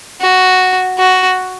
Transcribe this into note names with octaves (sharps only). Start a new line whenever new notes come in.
F#4
F#4